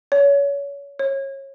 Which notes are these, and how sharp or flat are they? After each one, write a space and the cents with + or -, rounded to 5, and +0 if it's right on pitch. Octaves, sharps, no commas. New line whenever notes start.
C#5 +30
C#5 -25